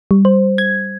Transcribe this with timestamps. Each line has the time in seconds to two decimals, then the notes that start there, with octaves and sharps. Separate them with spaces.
0.11 G3
0.25 C5
0.58 G#6